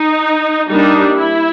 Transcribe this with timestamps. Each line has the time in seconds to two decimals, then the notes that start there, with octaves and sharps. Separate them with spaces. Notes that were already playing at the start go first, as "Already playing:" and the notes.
Already playing: D#4
0.69 G3 A#3 D4 D#4
1.18 E4